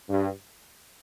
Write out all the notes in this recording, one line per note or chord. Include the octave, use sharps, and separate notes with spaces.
G2